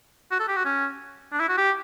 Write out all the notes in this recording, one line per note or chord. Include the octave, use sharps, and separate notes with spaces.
F#4
A4
G4
F#4
C#4
D4
E4
F#4
G4